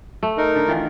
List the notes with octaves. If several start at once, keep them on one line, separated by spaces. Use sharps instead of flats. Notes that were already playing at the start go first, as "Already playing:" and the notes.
A3
D#4 A#4
D3
D#3 E3 F4